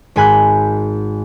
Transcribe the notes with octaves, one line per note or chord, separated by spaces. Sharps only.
G#1 G#2 G#5 B5 F#6 G6